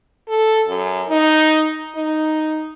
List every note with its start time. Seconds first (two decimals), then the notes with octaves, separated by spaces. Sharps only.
0.28 A4
0.68 F#2
1.09 D#4
1.96 D#4